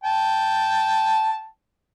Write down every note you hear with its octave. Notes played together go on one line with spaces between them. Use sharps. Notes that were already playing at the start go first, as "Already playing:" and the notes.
G5 A5